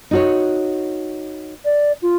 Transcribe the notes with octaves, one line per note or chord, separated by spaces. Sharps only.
D#4 F#4 C#5
D5
F4